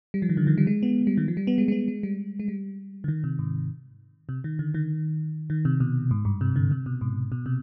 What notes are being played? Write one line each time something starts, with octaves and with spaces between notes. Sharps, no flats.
G3
F3
D#3
D3
D#3
G3
G#3
B3
G3
D#3
F3
G3
B3
G#3
G#3
B3
G#3
G3
G#3
G3
D3
D#3
C3
G#2
C3
D#3
D3
D#3
D#3
C3
B2
G#2
G2
C3
D3
C3
B2
G#2
B2
C3